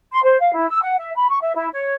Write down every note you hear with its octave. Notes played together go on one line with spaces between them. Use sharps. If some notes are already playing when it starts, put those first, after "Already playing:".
C6
C5
F5
E4
E6
F#5
E5
B5
C#6
E5
E4
C#5